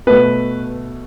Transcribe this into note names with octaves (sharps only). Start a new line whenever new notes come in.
B2 A3 B4